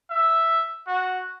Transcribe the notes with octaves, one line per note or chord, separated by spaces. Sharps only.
E5
F#4